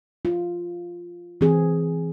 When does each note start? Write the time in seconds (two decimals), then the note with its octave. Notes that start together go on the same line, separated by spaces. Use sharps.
0.25 F4
1.41 E3 C4 G#4